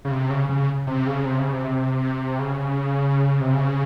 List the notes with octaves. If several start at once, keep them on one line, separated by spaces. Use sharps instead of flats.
C#3
C3
C#3
C#3
C3
C#3
C3
C#3
C3
C#3
C3
C#3